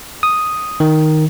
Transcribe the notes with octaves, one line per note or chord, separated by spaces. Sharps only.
D#6
D#3